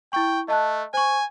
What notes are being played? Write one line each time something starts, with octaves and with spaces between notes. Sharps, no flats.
E4 G5 C#6
A3 D#5 A5 F#6
C5 G#5 C#6